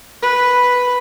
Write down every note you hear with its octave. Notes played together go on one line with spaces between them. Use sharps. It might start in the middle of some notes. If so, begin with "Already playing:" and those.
B4